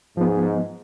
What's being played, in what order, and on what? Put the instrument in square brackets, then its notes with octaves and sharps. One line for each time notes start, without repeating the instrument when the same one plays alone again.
[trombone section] G#2 [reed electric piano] F3 B3